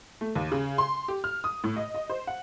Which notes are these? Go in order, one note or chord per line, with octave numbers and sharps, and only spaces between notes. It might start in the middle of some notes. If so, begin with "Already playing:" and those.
A3
D#2
C#3
C6
G4
F6
D#6
A2
D#5
D#5
C5
F#5